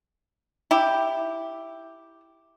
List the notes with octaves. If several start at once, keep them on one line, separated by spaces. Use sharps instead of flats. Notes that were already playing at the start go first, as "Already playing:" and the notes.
E4 G4